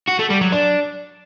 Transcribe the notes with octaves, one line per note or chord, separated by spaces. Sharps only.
F#4
A3
G3
F#3
D4